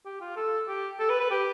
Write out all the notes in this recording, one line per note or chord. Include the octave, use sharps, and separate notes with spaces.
G4
F4
A4
G4
A4
B4
B4
G4